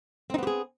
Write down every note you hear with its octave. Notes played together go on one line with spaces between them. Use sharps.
B3 C4 D#4 G4 G#4